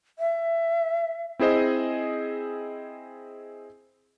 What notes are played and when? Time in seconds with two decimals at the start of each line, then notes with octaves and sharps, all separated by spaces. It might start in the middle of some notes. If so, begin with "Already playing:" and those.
0.19 E5
1.39 C4 E4 G#4 C5 D#5